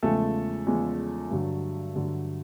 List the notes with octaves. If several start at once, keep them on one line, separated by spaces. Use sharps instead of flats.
E2 C#3 F3 G#3 A3 A4
E2 C#3 F3 G#3
G2 D3 F#3
G2 D3 F#3